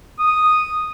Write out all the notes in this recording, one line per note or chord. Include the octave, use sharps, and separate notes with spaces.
D#6